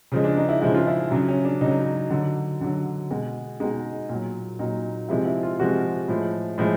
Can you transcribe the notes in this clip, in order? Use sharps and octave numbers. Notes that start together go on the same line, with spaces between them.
C#3 F3 G#3
D4
D#4
E4
C#3 F3 G#3 E4
F4
E4
C#3 F#3 D4
C#4
D4
C#3 F#3 D#4
D3 F#3
D3 F#3
B2 G#3
B2 G#3 D#4
A#2 F#3
A#2 F#3 D#4
C3 F3 G#3 E4
E4
F4
C3 F3 G#3 F#4
A2 F3 G#3
A2 F3 G#3